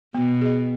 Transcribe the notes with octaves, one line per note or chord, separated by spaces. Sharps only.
B2 B3
G#4 D#5